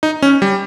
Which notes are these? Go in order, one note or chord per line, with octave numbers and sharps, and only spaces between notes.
D#4
C#4
G3